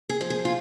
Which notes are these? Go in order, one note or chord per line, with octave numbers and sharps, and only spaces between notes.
G#4
F3
G#4
F4